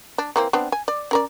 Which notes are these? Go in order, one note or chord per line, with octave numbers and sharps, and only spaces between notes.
D4
E3 A#3 C4
B3 C4 D4
G#5
D5
C#4 A#4 D5